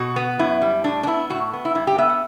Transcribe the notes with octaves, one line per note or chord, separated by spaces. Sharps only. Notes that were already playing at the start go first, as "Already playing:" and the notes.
Already playing: B2 F#4
B3
F#2 E4
G3
A2 D4
D4
B3 E4
A2 F#4
B3
E4
G2 E4
G4
B3 E5
F#5